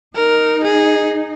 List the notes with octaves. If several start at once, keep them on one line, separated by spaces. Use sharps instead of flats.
D#4 A#4
G#4